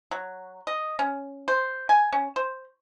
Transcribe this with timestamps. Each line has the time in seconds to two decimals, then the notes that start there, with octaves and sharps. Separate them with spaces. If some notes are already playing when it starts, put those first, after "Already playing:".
0.11 F#3
0.67 D#5
0.99 C#4
1.48 C5
1.89 G#5
2.13 C#4
2.36 C5